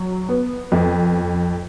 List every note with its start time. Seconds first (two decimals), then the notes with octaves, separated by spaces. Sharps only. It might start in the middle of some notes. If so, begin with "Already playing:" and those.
Already playing: F#3
0.29 B3
0.72 F2